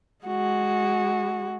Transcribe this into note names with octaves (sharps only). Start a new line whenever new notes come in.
G#3 F#4